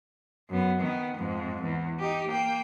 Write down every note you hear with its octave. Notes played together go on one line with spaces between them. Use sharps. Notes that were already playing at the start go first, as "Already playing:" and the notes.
F#2 B3
D#3 B3
F2 G#2
E2
D#4 G4
A#3 G5